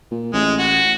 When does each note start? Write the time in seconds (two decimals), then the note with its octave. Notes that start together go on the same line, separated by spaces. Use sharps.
0.11 A#2
0.34 A1 G#3
0.59 F#4